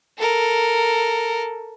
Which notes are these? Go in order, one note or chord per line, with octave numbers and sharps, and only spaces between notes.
A4 A#4